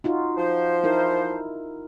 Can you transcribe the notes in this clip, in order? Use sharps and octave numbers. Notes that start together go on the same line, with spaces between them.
D#4 F4 F#4
F3 C5
D#4 E4 A#4